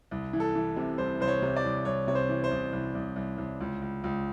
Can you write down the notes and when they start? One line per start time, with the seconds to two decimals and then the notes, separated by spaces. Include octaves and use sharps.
0.11 C2
0.33 E3
0.40 A4
0.55 E3
0.76 C3
0.98 C2 C5
1.20 C2 C5
1.28 C#5
1.42 C3
1.56 D5
1.64 C2
1.85 C2 C#5
2.07 C3 C#5
2.15 C5
2.29 E3
2.44 C5
2.51 C2
2.73 C2
2.95 C2
3.16 C2
3.38 C2
3.61 C#2
3.82 C#2
4.04 C#2